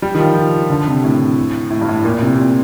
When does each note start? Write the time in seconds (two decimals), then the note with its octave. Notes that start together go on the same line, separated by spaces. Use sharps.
0.02 G3
0.15 D#3
0.19 F3
0.70 D3
0.87 C3
1.04 A2
1.70 A2
1.81 G2
1.88 A2
2.05 A#2
2.22 C3
2.39 A#2